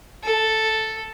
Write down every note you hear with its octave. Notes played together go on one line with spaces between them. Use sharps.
A4